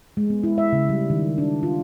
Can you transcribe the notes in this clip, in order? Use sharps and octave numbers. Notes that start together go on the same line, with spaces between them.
G#3
B3
E4
E5
C#3
G3
D#3
D4
F4